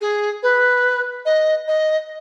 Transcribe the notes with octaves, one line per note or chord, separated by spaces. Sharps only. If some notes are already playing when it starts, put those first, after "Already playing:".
G#4
B4
D#5
D#5